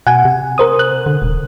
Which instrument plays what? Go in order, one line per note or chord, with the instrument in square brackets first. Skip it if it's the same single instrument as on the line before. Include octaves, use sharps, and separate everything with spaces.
[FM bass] B2 [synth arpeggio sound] F#5 G#5
[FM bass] C3
[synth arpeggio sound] A#4 C5 D#6
F#6
[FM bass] D3
D#1